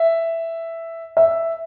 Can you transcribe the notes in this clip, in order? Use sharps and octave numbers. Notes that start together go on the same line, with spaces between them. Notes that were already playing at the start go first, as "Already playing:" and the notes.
Already playing: E5
E5